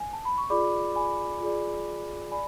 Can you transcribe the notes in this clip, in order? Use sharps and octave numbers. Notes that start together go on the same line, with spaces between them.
G#5
A5
B5
C#6
F4 G#4 D5 B5 D6
G#5 B5
F4 G#4 D5
D5 G#5 B5